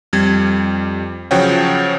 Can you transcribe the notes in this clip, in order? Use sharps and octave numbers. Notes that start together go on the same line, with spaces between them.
F2 G3 G#6
C#3 F3 F#3 C#5 F#5 G5